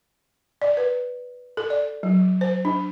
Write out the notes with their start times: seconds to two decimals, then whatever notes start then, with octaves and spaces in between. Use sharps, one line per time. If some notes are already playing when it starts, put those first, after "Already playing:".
0.62 D5
0.77 B4
1.57 A4
1.70 D5
2.03 F#3
2.41 C5
2.65 D4